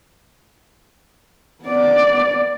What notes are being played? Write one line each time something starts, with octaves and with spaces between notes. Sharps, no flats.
B3 D5